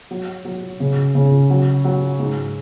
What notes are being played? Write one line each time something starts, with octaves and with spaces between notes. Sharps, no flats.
F#3
F#3
C#3
C#3
F#3
F#3
G#2